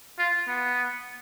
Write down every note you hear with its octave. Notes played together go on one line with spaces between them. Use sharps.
F4
B3